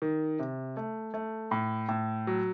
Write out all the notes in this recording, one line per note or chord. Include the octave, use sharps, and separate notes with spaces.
D#3
C3
A3
A3
A2
A2
F#3